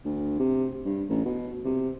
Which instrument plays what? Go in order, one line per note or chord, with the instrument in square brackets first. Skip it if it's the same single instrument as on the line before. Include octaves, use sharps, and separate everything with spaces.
[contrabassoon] D2
C3
G2
A1
B2
C3